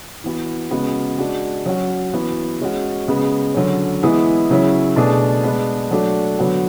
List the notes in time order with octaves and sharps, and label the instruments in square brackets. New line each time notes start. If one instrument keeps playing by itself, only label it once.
[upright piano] E3 B3 F#4
C#3 G#3 B3 F#4
G#3 D4 F#4
F#3 C#4 F#4
E3 B3 F#4
G#3 C#4 F#4
C#3 G#3 B3
D3 F#3 C#4
E3 G#3 B3 E4 G#4
C#3 F#3 C#4 E4
B2 A3 D4 G#4
G#3 B3 D4
F#3 A3 D4 F#4
D3 F#3 B3 F#4